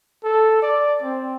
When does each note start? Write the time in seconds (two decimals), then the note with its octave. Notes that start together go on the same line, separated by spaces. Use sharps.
0.24 A4
0.62 D5
1.02 C4